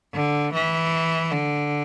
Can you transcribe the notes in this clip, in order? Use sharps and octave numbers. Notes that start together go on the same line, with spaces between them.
D3
E3
D3